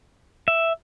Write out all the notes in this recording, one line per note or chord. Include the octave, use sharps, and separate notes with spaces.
E5